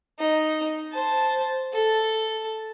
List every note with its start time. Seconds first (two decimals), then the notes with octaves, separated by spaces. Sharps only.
0.19 D#4
0.92 C5 A5
1.73 A4